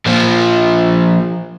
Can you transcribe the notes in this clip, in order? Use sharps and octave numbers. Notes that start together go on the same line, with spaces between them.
A#2 F3